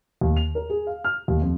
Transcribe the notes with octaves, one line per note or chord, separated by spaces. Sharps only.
D#2
F7
A#4
G#4
F5
F6
D#2
F2